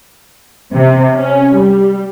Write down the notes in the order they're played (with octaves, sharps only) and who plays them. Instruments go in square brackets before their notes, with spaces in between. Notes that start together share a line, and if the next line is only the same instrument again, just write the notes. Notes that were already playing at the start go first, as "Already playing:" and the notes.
[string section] C3
C#4
G3